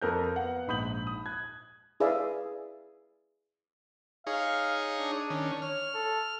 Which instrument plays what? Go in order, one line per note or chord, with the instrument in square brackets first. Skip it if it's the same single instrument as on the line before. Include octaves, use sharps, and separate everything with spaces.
[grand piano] F2 A4 A#4 F#6 G6
B3 F5 F#5
A#1 G#2 B5 D#6 G6 F#7
D#6
F#6 G#6
[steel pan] E4 G#4 B4 D5 E5 F5
[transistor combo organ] D#4 G#4 C#5 [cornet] F5
[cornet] D4
[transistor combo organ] D#3 C#4
[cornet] C#5 [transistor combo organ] F6
[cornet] A4